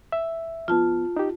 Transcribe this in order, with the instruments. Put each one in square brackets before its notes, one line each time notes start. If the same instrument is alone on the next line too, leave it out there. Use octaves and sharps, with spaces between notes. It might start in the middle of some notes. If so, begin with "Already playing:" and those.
[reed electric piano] E5
[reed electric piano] F2 B3 [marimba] F4 A5
[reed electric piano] D#4 G4